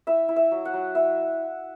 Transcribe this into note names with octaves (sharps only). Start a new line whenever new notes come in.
E4 E5
E4
E5
F#3
F#5
F#3
E4 E5